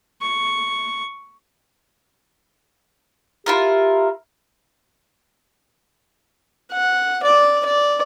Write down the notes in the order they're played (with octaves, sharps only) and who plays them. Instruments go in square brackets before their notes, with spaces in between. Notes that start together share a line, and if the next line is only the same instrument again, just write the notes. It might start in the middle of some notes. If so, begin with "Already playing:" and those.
[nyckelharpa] C#6
[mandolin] E4 F4 A#4 [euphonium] G4
[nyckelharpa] F#5
D5
D5